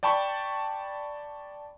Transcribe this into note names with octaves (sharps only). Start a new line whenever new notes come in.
D5 G5 A5 B5 C#6